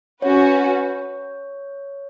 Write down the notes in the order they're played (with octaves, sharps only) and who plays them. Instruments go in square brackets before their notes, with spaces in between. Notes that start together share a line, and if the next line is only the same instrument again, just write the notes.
[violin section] C#4 F#4 B4 [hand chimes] C#5